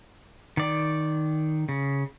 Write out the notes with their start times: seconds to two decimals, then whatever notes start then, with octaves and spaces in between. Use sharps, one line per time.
0.57 D#3 D5
1.69 C#3